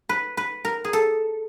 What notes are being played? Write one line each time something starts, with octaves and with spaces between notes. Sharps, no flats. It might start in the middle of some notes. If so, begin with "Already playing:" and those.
B4
B4
A#4
G#4
A4